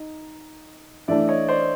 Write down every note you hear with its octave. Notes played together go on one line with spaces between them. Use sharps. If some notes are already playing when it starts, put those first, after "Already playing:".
Already playing: D#4
E3 A3 D4 D5 E5
C#5 D#5
C5 D5